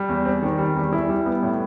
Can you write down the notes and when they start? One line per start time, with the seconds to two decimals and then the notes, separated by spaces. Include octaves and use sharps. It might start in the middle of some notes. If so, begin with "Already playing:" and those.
Already playing: G3
0.09 E2
0.25 C4
0.42 D#3
0.58 G3
0.75 E2
0.93 E4
1.09 G3
1.26 B3
1.43 A2